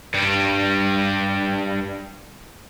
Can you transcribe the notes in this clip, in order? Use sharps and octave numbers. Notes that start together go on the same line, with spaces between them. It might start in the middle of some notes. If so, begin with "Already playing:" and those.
G2 G3